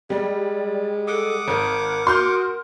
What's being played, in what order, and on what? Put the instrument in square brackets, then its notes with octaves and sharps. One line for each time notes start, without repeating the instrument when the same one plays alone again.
[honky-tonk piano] G3 [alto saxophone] G#3 [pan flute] D5
[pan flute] A4 [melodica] F#5 D6 D#6
[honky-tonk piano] G#1 [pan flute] A#4
[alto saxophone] F#4 [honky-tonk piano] C6 F6 G6